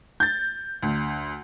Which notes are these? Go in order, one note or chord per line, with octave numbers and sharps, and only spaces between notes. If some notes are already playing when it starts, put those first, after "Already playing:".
G6 A6
D2